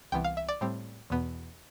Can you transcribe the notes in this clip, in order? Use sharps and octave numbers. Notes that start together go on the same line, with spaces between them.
C2 C3 E3 B3 G5
F5
E5
D5
A2 G3 C4
E2 B2 B3